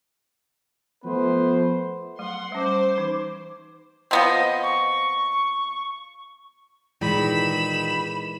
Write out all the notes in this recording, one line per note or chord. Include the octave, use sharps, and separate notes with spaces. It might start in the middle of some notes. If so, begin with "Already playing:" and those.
F3 A3 B3 B4 C5
F#3 A3 F#5 C6
G3 C#4 C5 D6
E3 D#4
F3 B3 C4 D#5
C#6
A#2 D#3 E3 G#3 B5 E7